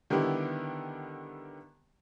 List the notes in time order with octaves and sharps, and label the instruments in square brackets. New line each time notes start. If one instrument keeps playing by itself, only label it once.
[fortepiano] D3 D#3 G3 B3 E4 G4